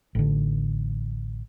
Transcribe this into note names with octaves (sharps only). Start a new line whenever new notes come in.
A1 D3